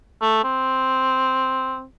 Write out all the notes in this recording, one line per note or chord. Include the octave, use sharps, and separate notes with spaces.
A3
C4